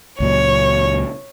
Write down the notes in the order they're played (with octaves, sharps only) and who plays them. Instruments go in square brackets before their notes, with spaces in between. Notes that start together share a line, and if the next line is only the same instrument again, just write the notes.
[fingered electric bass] C#2 A#2 F#3 [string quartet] C#5